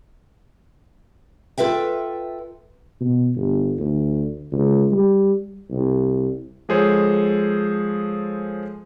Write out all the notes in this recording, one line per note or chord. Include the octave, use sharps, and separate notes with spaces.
F4 A4 B4 E5 G5
B2
G1
D2
C#2
G3
C2
F3 G#3 G#4 A4 C5 C#5